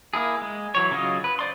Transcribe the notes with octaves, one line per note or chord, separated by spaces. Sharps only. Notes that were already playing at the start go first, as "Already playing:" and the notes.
A#3 E4 G#4
G#3
E3 F#3 C#5
C#3 F#3 F4 D#5
B4
C5 D5 C6